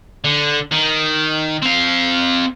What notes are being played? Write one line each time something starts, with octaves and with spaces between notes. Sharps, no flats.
D3
D#3
C4 F5